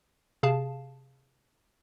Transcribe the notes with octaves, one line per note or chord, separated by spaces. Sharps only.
C3 G#4 F5 A5